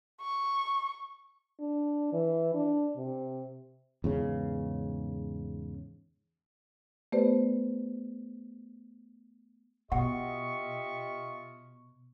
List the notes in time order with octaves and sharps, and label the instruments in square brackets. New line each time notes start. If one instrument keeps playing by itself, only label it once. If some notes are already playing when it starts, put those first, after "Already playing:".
[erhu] C#6
[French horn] D4
E3
D4
C3
[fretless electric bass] E2 G#2 C#3
[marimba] A3 B3 G4 B4 C5 D5
[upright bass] B2 [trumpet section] F4 C#6 [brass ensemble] G4 D#5 E5 [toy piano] F#5